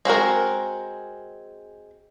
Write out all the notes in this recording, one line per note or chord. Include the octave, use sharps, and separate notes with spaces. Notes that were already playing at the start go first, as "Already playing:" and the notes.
G#3 C4 F#4 A#4